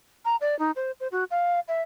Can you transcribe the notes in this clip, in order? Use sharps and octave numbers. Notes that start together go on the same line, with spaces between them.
A#5
D5
D#4
C5
C5
F#4
F5
E5